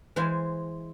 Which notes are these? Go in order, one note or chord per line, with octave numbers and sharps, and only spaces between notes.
E3 G#3 C5 F5 G#5